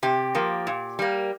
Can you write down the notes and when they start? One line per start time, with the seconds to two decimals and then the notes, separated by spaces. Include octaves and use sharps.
0.03 C3 G4
0.35 F3 A#3
0.67 A#2
0.99 G3 A#3